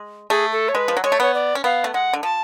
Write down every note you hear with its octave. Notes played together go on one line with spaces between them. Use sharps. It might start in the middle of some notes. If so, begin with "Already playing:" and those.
Already playing: G#3
A3 G#4
A4
C#5
G#3 B4
F3
F#3
G#3 C#5
A3
B3 C#5
D5
C#4
B3 F5
A3
G#3 F#5
D3
F3 A5